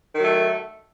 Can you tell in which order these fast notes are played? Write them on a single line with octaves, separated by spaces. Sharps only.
D#3 F#3 A3